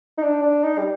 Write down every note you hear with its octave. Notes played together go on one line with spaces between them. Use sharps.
D#4
D4
D4
D#4
G3